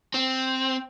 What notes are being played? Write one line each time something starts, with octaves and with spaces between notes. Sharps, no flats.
C4